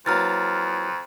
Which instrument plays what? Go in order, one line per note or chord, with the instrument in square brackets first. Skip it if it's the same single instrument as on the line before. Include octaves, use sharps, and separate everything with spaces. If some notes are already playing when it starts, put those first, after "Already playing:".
[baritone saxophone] F2 [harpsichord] E3 F#3 A#3 [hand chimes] A#5 F6 A6